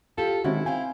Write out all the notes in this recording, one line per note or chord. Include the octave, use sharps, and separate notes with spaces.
F4 G4 A4
D#3 G#3 C4 C#4 E4 F#4
C4 F5 G5 G#5